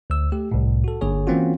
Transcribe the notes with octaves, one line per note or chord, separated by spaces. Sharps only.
D2 E6
A3 G4
C2 A2
F#4 A4
G1 D3 A#3 G#4 C#5
E3 A#3 C4 C#4 F4 F#4